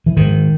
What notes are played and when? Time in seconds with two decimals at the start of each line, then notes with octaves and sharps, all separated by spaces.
0.06 E3
0.17 G#2 D#3